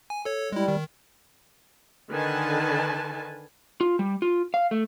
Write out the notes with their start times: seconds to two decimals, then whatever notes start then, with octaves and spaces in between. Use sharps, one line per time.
0.10 G#5
0.25 A4 C#5
0.52 G3 G#3 E4
0.68 D#3
2.11 D3 D#3 B4 G#5 A5
3.81 F4
3.99 G3
4.22 F4
4.54 F5
4.71 A3